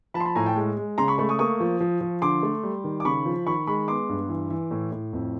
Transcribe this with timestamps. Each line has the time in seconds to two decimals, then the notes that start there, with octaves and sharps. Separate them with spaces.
0.14 F3 A5 B5
0.20 C6
0.25 A5 B5
0.36 A2 G#5 A#5
0.46 G5 A5
0.56 G#3
0.77 G#3
0.98 C#3 A#5 C6
1.08 B5 C#6
1.18 A3 B5 C#6
1.29 C#6 D#6
1.39 A#3 C#6 D#6
1.60 F3
1.80 F3
2.01 F3
2.22 D3 C6 D6
2.43 A3
2.63 G3
2.84 D#3
3.00 D6
3.05 C#3 B5 C#6
3.26 F3
3.46 D#3 B5 C#6
3.67 G#3 B5 C#6
3.88 B3 C6 D6
4.09 G2
4.29 E3
4.50 E3
4.71 A2
4.92 A2
5.13 F2